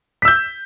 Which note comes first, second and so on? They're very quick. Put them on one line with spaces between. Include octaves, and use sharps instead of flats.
B6 E6 G6